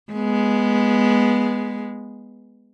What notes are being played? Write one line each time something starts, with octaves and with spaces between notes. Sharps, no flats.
G#3 B3